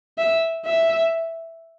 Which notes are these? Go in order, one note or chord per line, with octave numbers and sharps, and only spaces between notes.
E5
E5